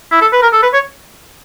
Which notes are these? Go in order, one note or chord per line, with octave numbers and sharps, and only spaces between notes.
E4
A4
B4
A#4
A4
B4
C#5